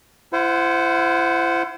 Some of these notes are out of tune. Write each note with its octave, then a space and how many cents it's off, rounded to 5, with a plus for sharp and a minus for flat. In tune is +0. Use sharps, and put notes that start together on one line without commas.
E4 +40 C5 -15 F#5 +0